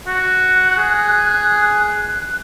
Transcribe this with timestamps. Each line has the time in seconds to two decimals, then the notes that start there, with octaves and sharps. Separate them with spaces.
0.07 F#4 F#6
0.78 G#4